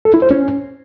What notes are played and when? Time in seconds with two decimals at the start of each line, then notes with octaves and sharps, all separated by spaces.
0.05 A4
0.14 E4
0.22 C5
0.31 C#4